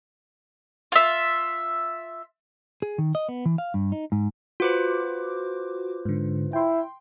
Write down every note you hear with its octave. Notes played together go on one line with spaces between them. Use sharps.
F4 E5
G#4
D#3
D#5
B3
E3
F5
G2
D#4
G#2
F4 F#4 B4 C5 D6
G#2 D3
E4 G5 C6